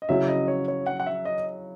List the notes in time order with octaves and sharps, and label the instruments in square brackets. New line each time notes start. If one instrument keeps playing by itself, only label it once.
[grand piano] D#5
[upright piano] C#3 F#3 C#4 E4 [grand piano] E5
[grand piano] D#5
C#5
C#5
F#5
F#5
E5
D#5